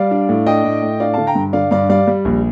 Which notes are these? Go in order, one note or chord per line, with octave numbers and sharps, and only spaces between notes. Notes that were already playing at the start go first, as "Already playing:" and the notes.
Already playing: G3 D5 F5
D4
A2
D4 D#5 G5
A2
A2
D4 D5 F5
D3 F5 A5
G5 A#5
G2
D3 D5 F5
G2 D5 F5
G3 D5 F5
G3
A#1